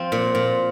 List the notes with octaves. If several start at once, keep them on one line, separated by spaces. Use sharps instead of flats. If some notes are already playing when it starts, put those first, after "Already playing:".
Already playing: F3 C4 F4
A#2
A#2